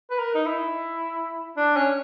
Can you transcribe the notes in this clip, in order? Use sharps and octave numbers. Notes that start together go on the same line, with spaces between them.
B4
A#4
D#4
E4
D4
C#4